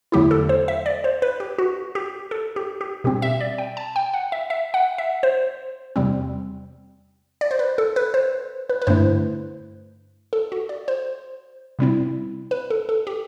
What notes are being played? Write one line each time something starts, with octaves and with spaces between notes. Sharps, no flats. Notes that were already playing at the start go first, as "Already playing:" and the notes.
E2 D3 F#3 A3 E4 G4
A4
C5
E5
D5
C5
B4
G4
F#4
G4
A4
G4
G4
B2 G3 C4 G4
E5
D5
G5
A5
G5
F#5
E5
E5
F#5
E5
C5
E2 C3 G3 C4
D5
C5
B4
A4
B4
C5
B4
B4
G2 D3 A3 E4 C5
A4
F#4
D5
C5
C3 G3 C4 E4
B4
A4
A4
G4